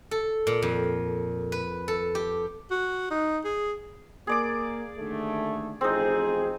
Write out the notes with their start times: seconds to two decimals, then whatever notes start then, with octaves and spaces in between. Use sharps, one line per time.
0.11 A4
0.47 A#2
0.62 F2
1.52 B4
1.88 A4
2.15 G4
2.71 F#4
3.11 D#4
3.45 G#4
4.27 A#3 G#4 D5 D6
4.98 D#2 D3 A3
5.81 A1 F2 C4 D#4 G#4